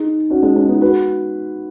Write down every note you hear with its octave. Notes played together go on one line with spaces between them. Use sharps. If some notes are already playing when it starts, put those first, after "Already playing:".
Already playing: D#4 G#4
C#4 F#4
G#3 C#4
G#3 C#4
B3 D#4
F#4 B4